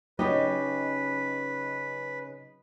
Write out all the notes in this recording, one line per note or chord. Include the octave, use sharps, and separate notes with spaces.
C#3 F#3 D#4 G4 B4 D#5